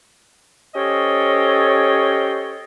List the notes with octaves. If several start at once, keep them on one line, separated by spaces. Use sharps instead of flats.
C#4 G4 A4 C5 C#5 D#5